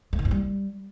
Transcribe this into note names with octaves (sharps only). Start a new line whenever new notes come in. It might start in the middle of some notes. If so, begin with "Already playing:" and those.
A3
D#3
G2
G3